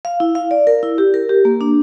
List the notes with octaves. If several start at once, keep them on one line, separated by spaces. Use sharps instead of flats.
F5
E4
F5
D5
A#4
E4
G4
A#4
G4
A#3
D4